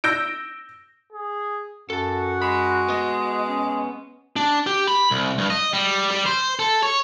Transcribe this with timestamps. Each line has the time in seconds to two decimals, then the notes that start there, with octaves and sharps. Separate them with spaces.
0.04 E6 G6 A#6 D7
1.12 G#4
1.90 F#2 F#4 A4 A5
2.42 G#3 B5
2.88 B3 D#5
3.47 C#4
4.36 D4
4.67 G4
4.87 B5
5.11 C2
5.38 G2
5.50 D#5
5.73 G3
6.11 G3
6.26 C5
6.59 A4
6.83 C#5